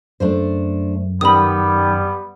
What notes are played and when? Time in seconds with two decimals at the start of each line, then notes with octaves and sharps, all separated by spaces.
0.20 F#2 A3 D4 C5
1.21 D#3 G3 B3 C#4 B4 B5 D#6